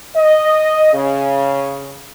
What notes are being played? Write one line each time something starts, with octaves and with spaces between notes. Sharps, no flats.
D#5
C#3